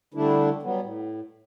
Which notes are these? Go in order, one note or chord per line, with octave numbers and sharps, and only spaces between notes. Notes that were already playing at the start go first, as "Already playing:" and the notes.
D3 G3 A3 D4 E4
F#3 G3 B3
A2